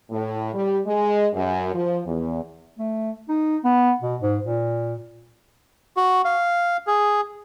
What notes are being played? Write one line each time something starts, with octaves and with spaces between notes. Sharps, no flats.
A2
G3
G#3
F#2
F3
E2
A3
D#4
B3
B2
G#2
A#2
F#4
F5
G#4